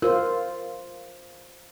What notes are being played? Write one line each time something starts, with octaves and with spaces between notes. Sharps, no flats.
F4 A#4 C5